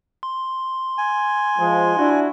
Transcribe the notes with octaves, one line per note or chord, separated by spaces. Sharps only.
C6
G#5
F3 G#3
D4 E4 F#4